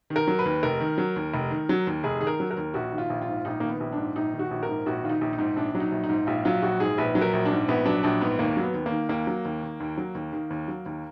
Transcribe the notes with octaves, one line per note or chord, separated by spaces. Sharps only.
D#3
A#4
F#3
B4
D#2
F1 A#4
D#3
F#3
D#2
F1
D#3
F#3
D#2
F1 G#4
D#3 G#4
A#4
F#3
A#4
D#2
A#1 F#4
D#3
F4
A#1
F4
G#2
A#1 D#4
D#3 A#3
B3
A#1
D4
G#2
A#1 D#4
D#3
F#4
A#1
A#4
G#2
A#1 F#4
D#3 F4
D#4
A#1
D#4
G#2
A#1 D4
F#3
D#4
A#1
D#4
G#2
A#1 F4
F#3 F4
A#1 F#4
G#2 G#4
A#1 B4
F#3
A#4
A#1
D4
G#2
A#1 B3
F#3 D4
A#1 D4
G#2 B3
D#2 A#3
F#3
B3
D#2
A#3
D#3
D#2 A#3
F#3
D#2
D#3
D#2
F#3
D#2
D#3
D#2
F#3
D#2